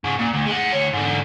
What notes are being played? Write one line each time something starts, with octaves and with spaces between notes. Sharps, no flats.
G#2 C#3
A#2
D2
G#3 F#5
D2 C#5
G#2 D3